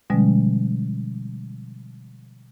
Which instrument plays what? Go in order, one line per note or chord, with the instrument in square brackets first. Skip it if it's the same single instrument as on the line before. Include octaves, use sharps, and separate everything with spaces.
[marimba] B2 D3 F3 G3 G#3 C#4